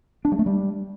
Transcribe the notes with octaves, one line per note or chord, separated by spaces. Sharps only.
D4
G3
A3
G3